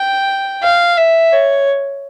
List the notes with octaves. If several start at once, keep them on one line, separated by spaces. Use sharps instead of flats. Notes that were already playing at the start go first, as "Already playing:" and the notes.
Already playing: G5
F5
E5
C#5